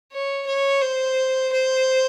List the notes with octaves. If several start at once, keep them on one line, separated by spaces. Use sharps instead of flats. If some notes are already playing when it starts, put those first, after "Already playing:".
C#5
C#5
C5
C5